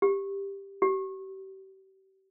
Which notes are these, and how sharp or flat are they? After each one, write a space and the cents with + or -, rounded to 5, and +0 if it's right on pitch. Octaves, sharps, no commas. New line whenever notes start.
G4 +10
G4 -35